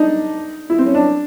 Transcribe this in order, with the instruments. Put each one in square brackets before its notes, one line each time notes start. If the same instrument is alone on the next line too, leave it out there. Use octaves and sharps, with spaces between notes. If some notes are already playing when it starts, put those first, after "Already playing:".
Already playing: [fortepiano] D4 D#4
E4
C4
C#4
D4